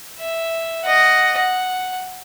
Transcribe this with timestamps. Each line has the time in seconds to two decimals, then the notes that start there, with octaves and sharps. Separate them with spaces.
0.19 E5
0.84 D#5 F#5
1.36 F#5